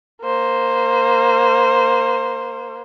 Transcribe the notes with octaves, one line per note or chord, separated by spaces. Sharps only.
A#3 C5